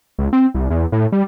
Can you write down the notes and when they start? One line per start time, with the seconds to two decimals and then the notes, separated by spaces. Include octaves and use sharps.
0.19 C#2
0.33 C4
0.55 C2
0.70 E2
0.92 A2
1.12 G3